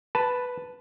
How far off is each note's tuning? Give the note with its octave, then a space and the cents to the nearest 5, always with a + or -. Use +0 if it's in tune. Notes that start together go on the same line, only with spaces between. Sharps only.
B4 +0 A5 +0